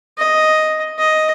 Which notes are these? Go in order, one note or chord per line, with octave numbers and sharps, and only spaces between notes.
D#5
D#5